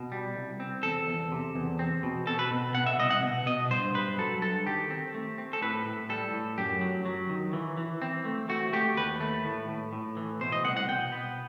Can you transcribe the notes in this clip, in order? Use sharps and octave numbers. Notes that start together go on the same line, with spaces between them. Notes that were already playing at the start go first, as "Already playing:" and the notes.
Already playing: B2
G3
C2
C4
E2 A4
E2
C3
E2
C4
B2
B2 A4
B4
B2
B2 F#5
E5
C2 D#5
F#5
B2
B2 D#5
G2 C5
G2 B4
F#3 A4
G2 A4
D#3 G4
C4
A3
C4
A4
A2 B4
A2
G3 A4
A2
F#2 G4
F#3
F#3
D#3
E3
E3
C4
A3
A3 F#4
A3 G4
D#2 B4
A3
A2
A2
A2
E3
B2 C5
D#5
C2 F#5
F#5
B2 G5
B3